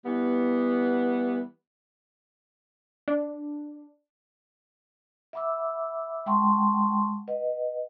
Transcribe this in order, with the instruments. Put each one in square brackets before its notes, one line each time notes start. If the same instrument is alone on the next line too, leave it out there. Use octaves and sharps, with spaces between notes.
[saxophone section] E3 G3 B3
[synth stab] D4
[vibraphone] E5 F#5 B5 D6 E6
G#3 F#5 G5 A5 C6 C#6
B4 D#5 F#5